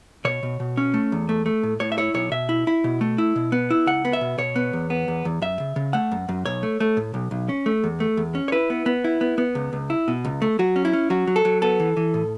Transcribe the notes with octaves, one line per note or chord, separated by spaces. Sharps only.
B2 C#5
B2
B2
C#4
A3
E2
A3
A3
A2
A2 C#5
E5
E4 C#5
B1 C#5
B2 E5
E4
E4
B2
A3
E4
B2
B3
E4
C#2 F#5
B3
E5
B2
B2 C#5
B3
E2
B3
E2
E2
F#2 E5
C#3
C#3
A3 F#5
F#2
F#2
B1 C#5
A3
A3
A2
B1
B1
C#4
A3
E2
A3
E2
C#4
C#5
E4 B4
B3
B3
E4
B3
B3
C#2
C#2
E4
B2
C#2
A3
F#3 F#4
C#4
E4
C#4
F#3 F#4
F#3
A4
F#3
B3 A4
E3
E3
A2